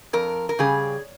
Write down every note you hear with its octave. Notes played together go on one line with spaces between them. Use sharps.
F2 A#4
A#4
C#3 G3 G#4